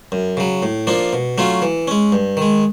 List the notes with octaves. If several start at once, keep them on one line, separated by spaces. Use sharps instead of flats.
F#2
C#3 F#3
A2
F3 A#3 D4 F4
B2
F#3 A3 C#4 F4
E3
G#3 C#4
G2
D#3 G#3